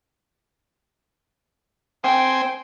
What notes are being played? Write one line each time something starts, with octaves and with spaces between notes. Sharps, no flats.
C4 C5 G5 G#5